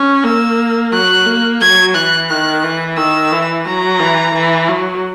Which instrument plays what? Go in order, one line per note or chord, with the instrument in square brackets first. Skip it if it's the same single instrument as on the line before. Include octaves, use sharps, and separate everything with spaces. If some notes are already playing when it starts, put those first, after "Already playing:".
Already playing: [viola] C#4
[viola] A#3 [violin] E6
[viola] F#3 [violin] F#6
[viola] A#3
[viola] F#3 [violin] G#6
[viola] E3 [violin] F#6
[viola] D#3 [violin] F#6
[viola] E3
[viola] D#3 [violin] E6
[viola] E3
[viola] F#3 [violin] A#5
[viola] E3
E3
F#3